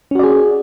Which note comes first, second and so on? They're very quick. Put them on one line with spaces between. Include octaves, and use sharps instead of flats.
C#4 F#4 D5 G#4